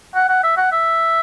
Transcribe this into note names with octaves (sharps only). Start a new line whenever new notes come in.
F#5
F#5
E5
F#5
E5